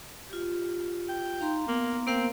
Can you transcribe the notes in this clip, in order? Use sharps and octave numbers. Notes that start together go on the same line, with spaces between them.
F4 G4
G5
D#4 F5 A#5 C6
A#3 B3
A#3 C4 A#4 F5